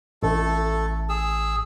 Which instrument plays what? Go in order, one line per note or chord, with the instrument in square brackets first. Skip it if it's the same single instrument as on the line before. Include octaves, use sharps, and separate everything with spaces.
[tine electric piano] A1 [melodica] A3 A4
[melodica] G#4 E6